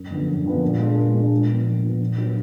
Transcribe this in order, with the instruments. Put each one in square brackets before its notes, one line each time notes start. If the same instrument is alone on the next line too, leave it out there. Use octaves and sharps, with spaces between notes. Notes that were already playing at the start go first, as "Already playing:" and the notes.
Already playing: [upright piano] F#2
D3 F3 B3 D4
F#2
D3 F3 B3 D4
A#2
G#3 D4 F4
A#2
G#3 D4 F4
A#2
F3 B3
A#2
F3 B3
A#2
F#3 B3 F4